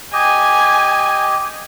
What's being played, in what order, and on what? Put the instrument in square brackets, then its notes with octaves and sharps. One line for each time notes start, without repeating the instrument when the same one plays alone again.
[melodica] G4 D#5 [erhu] G#5